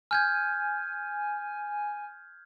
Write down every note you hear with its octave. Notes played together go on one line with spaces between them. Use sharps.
G#5 F6 G6 G#6